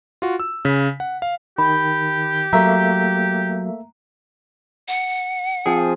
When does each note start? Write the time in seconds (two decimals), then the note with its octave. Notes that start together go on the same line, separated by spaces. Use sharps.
0.22 F4 F#4
0.40 E6
0.65 C#3 B6
1.00 F#5
1.22 F5
1.58 D#3 G4 B5
2.53 F#3 A3 A#3 E5 A#5
4.88 F#5
5.66 F3 C4 G#4